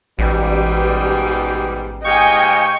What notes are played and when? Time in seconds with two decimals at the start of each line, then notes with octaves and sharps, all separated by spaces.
0.19 A1 G#2 B2 G3
2.04 G#2 G4 D#5 F5 G5 G#5 C#6